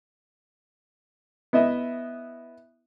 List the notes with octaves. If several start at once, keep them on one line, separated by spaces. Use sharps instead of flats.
B3 E4 D#5 E5